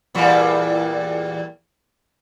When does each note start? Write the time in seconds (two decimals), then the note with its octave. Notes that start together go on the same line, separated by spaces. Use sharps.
0.15 E2 A#2 G3